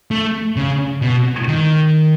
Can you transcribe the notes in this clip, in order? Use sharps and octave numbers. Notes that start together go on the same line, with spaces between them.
A3
C#3
B2
D#3